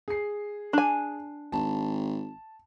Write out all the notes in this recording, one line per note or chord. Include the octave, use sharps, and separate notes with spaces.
G#4 C7
D4 G#5
G#1 A5